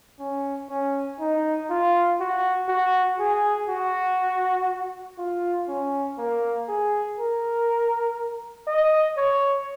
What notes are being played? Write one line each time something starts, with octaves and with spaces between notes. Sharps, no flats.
C#4
C#4
D#4
F4
F#4
F#4
G#4
F#4
F4
C#4
A#3
G#4
A#4
D#5
C#5